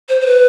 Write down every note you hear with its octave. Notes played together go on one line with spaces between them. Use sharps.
C5
C5
B4